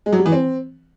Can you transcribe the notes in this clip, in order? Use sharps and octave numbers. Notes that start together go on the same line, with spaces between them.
G#3
F#3
G3
E3
C4